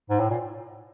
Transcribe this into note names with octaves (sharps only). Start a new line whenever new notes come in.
G#2
A2
A#2